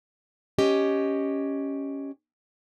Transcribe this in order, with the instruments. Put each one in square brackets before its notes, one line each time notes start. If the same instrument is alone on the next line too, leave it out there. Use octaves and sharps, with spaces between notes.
[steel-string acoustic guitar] C#4 G4 D#5